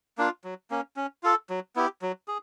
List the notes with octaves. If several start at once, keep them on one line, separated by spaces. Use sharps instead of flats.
A#3 D4 F4
F#3
A#3 C#4
C#4
F4 A4
F#3
B3 E4 G4
F#3
G#4